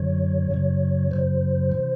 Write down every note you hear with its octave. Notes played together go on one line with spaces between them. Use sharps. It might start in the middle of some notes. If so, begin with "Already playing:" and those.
Already playing: F#2 D3 F#3 C#5
F#2 C#3 F#3
F#2 C#3 F#3 C5
C3 E3